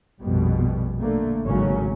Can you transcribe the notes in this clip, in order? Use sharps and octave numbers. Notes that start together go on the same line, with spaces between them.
A#1 F2 B2 G3
D3 A3 A#3
G#1 C#3 F#3 A#3 C#4